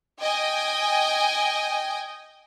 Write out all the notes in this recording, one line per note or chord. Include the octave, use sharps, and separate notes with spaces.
D#5 G5 G#5